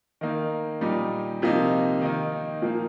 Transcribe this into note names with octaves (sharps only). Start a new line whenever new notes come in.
D#3 A#3 D#4
A#2 G3 D#4
C3 F3 A#3 D#4
D#3 A#3 D#4
A#2 F3 A#3 D#4